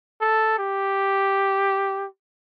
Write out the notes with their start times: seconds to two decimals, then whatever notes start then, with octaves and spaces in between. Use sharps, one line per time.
0.22 A4
0.59 G4